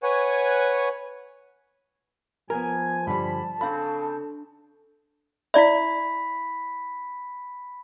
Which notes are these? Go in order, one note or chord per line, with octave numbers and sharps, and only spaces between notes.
B4 C#5 F#5 G#5 C#6
F3 B3 A#4 G#5
G2 D3 G3 A5 B5
C#3 C4 D4 A4 F5 B5
E4 D5 E5 B5 B6